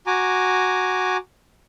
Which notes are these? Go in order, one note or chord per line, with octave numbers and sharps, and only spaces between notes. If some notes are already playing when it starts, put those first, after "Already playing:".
F#4 G#5 A#5 D6